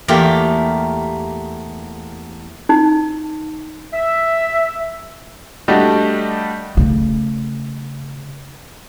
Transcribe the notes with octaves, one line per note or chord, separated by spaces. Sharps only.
E2 A3 A#3 F4 G4
D#4
E5
G3 A3 D4 F#4 G4 D#5
C#3 A3